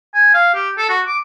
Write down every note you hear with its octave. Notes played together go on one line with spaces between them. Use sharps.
G#5
F5
G4
A4
F#4
D6